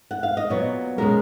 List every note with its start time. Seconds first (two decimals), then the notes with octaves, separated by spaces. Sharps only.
0.11 F#5
0.23 F5
0.37 D#5
0.50 A#2 F#3 B3 C#5
0.98 B2 G#3 C#4 A#4